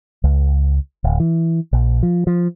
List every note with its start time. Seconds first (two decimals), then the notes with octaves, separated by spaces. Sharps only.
0.24 C#2
1.04 D1
1.20 E3
1.73 A#1
2.03 F3
2.27 F3